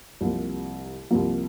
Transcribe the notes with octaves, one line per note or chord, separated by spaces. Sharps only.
C2 C3 F3 A#3
C2 C3 F3 A#3